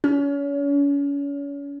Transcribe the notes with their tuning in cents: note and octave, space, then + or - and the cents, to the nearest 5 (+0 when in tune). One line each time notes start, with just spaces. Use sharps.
C#4 +35